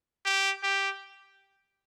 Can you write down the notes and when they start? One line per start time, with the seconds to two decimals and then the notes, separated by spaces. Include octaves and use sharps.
0.25 G4
0.63 G4